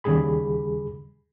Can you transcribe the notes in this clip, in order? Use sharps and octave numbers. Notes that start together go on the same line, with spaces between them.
D#2 C#3 G3 G#4 B5